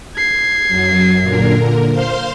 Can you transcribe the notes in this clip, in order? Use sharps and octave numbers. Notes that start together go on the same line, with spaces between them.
G#6 C7
F#2 F#3
A#2 D3 A#4
C5 F5 C6